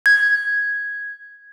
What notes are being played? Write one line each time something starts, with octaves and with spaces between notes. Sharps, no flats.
G#6